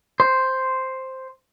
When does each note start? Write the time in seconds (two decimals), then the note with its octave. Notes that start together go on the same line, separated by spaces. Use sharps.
0.20 C5